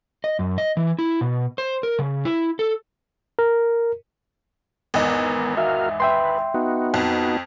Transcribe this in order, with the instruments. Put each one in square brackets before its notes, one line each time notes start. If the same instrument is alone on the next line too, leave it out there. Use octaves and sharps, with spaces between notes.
[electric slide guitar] D#5
F#2
D#5
E3
E4
B2
C5
A#4
C#3
E4
A4
[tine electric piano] A#4
[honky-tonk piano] G#1 E2 D#5 [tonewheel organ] B3 A#4
[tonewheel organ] F#4 A#4 F5 [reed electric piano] E5
[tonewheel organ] B4 [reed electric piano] E5 G5 C6
[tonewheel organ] B3 D#4 F#4
[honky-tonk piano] F2